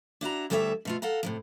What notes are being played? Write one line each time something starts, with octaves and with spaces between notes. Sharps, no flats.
D4 E4 F#4 A#5
D2 G3 A4 C#5 D#5 E5
B2 A3 F4
A4 F5 F#5 A#5
A2 C3 F3